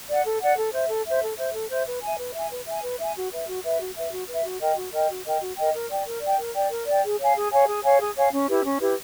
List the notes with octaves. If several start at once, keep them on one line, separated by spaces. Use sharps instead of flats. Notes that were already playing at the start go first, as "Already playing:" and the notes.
D5 F#5
A4
D5 F#5
A4
C5 E5
A4
C5 E5
A4
C5 E5
A4
C5 E5
B4
E5 G#5
B4
E5 G#5
B4
E5 G#5
B4
E5 G#5
F#4
B4 E5
F#4
B4 E5
F#4
B4 E5
F#4
B4 E5
F#4
A#4 D#5 G5
F#4
A#4 D#5 G5
F#4
A#4 D#5 G5
F#4
A#4 D#5 G5
A#4
D5 G5
A#4
D5 G5
A#4
D5 G5
A#4
D5 G5
G#4
C#5 F5 G#5
G#4
C#5 F5 G#5
G#4
C#5 F5 G#5
G#4
C#5 F5 G#5
C#4
E4 G4 B4
C#4
E4 G4 B4